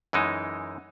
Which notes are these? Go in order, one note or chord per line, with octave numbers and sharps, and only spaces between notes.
F#2 E3 G#3 D#4